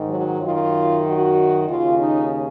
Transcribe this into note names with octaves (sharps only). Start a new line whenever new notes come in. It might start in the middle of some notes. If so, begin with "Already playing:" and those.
Already playing: G#2 D#3
F#3
F#2 D#3 F4
F#4
D#2 C#3 F4
D#4